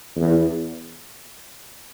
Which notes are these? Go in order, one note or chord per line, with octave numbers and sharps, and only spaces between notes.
E2